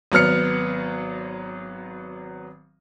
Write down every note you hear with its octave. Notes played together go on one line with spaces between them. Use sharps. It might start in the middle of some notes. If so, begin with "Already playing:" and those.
G#1 F#3 B3 F6 C#7